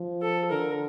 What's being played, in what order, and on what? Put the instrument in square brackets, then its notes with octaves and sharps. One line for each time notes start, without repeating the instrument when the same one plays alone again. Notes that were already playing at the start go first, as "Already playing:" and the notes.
Already playing: [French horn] F3
[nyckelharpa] A4
[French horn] D3 [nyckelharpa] A#4